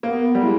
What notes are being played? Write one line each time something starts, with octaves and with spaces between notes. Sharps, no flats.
A#3 B3
G3
G#3 E4